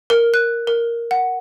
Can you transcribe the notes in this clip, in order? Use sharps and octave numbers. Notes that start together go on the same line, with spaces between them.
A#4
F#6
A#4
F#5